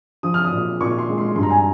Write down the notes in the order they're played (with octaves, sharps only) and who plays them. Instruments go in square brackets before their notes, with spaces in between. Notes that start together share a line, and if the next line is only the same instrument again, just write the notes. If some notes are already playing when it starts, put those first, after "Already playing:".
[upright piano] F3 D#6
F6
D#6
A#2
A#2 C#6
C6
G#3
C6
G2 C6
A#5
G#5
A#5